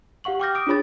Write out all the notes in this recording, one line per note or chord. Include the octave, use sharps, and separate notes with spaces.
G4 F5 F#5 C#6 F#7
G5 C#6 D6 F6 G6 A#6
D6 D#6 D7
D4 F4 G#4 C#5 B5 A6